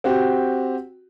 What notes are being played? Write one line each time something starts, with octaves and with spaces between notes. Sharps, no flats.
C4 F#4 G4